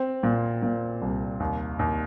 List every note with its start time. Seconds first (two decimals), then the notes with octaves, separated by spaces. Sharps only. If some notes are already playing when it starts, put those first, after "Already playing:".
Already playing: C4
0.23 A#2
0.63 A#2
1.01 C2
1.40 D#2
1.79 D#2